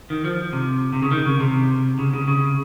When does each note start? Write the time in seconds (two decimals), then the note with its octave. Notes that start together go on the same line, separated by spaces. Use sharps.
0.10 D#3
0.25 F3
0.53 C3
0.93 C3
1.02 C#3
1.11 D#3
1.25 C#3
1.40 C3
1.99 C#3
2.13 C#3
2.28 C#3